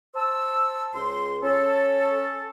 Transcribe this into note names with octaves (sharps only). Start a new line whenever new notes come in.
C5 A5 E6
C#2 C6
C#4 A4